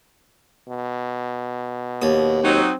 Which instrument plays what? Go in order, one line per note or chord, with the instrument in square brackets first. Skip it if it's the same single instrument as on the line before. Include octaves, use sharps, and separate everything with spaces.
[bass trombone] B2
[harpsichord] D#2 D#6
[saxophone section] F#3 D#4 [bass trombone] C4